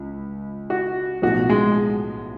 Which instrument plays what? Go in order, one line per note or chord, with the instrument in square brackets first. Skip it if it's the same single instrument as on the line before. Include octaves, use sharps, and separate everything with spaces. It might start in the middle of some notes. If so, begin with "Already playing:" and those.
Already playing: [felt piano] C#2
[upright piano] F#4
[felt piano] B1 A2 F3 [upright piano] F#4
[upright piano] G#3